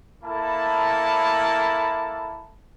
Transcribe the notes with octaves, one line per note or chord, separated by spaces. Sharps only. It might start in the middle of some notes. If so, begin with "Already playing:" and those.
A#3 E4 A4 A5 B5